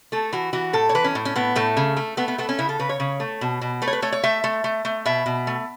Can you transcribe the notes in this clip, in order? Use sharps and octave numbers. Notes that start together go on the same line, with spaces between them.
A3 A4
E3 F#4
E3 F#4
A2 A4
C#5
E3 B4
C#4
A2
C#4
A2 B3
A2 A3
C#3
A3
A3 B3
B3
A3 B3
C#4
C#3 E4
A4
C#3 B4
C#5
C#3
A3
B2
B2
A3 B4
C#5
B4
A3 C#5
C#5
A3 E5
A3
A3
A3
B2 E5
B2
A3